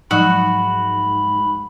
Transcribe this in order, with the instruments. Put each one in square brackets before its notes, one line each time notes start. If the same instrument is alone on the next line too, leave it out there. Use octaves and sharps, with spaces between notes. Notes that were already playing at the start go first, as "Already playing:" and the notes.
[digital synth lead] G#2 [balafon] F3 F#3 D#4 [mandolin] F#4 [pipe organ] B5